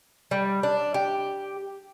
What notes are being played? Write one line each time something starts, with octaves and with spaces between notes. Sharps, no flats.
G3
D4
G4